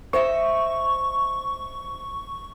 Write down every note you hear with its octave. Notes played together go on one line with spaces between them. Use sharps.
C5 D#5 E5 C#6